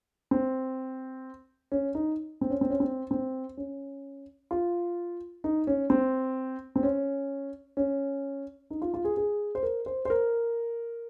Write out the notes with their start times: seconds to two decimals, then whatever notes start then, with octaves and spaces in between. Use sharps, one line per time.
0.31 C4
1.72 C#4
1.95 D#4
2.41 C4
2.50 C#4
2.61 C4
2.70 C#4
2.80 C4
3.11 C4
3.57 C#4
4.51 F4
5.44 D#4
5.67 C#4
5.90 C4
6.76 C4
6.83 C#4
7.77 C#4
8.70 D#4
8.82 F4
8.94 F4
9.04 G#4
9.17 G#4
9.55 C5
9.63 A#4
9.86 C5
10.05 C5
10.10 A#4